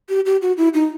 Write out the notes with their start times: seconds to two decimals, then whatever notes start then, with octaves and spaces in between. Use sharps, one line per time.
0.09 G4
0.26 G4
0.42 F#4
0.57 E4
0.74 D#4